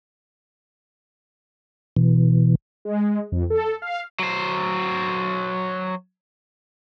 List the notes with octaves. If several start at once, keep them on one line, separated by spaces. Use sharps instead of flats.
B2 E3
G#3
F2
A4
F5
F#3 C5